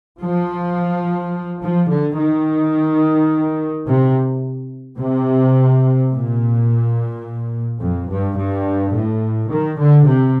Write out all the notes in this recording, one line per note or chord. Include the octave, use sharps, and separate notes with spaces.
F3
F3
D3
D#3
C3
C3
A#2
F2
G2
G2
A2
D#3
D3
C3